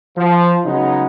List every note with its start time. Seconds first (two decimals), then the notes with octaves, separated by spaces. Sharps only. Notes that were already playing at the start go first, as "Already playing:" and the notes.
0.17 F3
0.64 C#3 F#3 G#3 B3 D#4